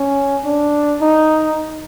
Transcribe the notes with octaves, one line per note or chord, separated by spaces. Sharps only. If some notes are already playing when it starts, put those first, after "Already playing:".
Already playing: C#4
D4
D#4